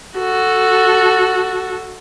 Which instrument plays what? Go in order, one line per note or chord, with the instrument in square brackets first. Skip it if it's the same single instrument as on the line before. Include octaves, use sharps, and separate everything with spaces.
[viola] F#4 A4